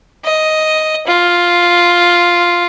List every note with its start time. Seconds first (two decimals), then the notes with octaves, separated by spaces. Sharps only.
0.25 D#5
1.07 F4